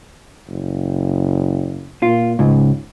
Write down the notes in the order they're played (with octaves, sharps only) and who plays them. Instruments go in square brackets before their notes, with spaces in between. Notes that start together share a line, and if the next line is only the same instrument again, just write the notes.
[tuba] F#1
[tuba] A#2 [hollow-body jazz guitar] F4
[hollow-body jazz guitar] C#2 [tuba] G#2